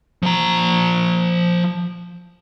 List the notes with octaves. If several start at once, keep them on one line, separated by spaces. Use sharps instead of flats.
F3 A#5